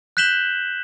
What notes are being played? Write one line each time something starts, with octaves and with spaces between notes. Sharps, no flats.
F#6 G6 B6 E7 F#7 G7